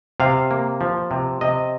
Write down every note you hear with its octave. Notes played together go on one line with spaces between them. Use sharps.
C3 F5
A#3
F3
C3
C3 D#5